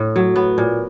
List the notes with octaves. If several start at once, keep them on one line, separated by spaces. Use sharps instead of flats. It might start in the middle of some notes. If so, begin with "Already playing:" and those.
Already playing: A2
F#3
B3
A#2